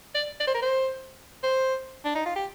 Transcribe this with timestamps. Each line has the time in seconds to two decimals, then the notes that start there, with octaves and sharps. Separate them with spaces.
0.15 D5
0.40 D5
0.47 C5
0.54 A#4
0.62 C5
1.43 C5
2.05 D4
2.15 D#4
2.26 F4
2.36 G4